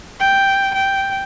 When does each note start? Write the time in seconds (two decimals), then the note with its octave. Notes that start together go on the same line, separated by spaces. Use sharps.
0.20 G5
0.74 G5